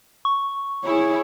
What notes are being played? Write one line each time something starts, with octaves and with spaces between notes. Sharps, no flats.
C#6
E4 G#4 C#5